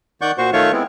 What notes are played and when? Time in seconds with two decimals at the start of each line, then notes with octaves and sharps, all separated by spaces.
0.21 D#3 D5 F#5 C#6 G6
0.38 A#2 F#4 C5 C#6
0.53 D#3 A3 F4 C#5 C#6
0.72 G#3 B3 C4 E4